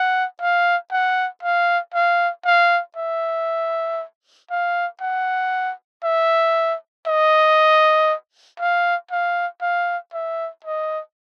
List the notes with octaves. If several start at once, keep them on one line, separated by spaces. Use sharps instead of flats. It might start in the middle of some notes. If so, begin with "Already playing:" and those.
Already playing: F#5
F5
F#5
F5
F5
F5
E5
F5
F#5
E5
D#5
F5
F5
F5
E5
D#5